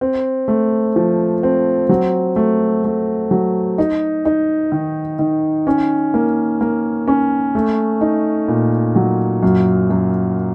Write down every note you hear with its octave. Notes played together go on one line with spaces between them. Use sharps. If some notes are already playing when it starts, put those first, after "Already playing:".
C4
A3
F3
C4
F#3
A3
A3
F#3
D#4
D#4
D#3
D#3
C#4
A#3
A#3
C#4
A3
D#4
A#2
F#3
F#2
F#2